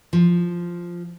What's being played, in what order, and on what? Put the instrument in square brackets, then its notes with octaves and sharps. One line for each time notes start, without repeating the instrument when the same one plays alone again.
[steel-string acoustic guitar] F3